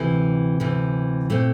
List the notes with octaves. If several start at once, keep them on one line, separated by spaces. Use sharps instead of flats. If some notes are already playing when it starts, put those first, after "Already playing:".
Already playing: D2 C3 E3
D2 C3 E3
A#2 A3 C4